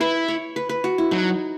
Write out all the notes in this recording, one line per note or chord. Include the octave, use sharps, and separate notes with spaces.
E4 B4
C#5
B4
B4
F#4
E4
F#3 D#4